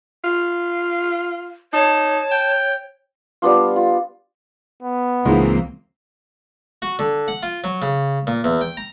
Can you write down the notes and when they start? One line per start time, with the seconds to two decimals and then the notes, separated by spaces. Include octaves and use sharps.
0.24 F4
1.73 D#4 C#5 A5
2.31 G5
3.42 G3 B3 D4 F4
3.76 F4
4.83 B3
5.25 C#2 G#2 E3 G#3 A#3 C4
6.82 F#4
6.99 D3
7.28 F#5
7.43 F4
7.64 F#3
7.82 C#3
8.27 A#2
8.44 E2
8.61 G5
8.77 A#5